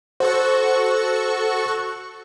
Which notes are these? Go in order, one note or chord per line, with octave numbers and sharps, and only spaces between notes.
F#4 A4 C5 C#6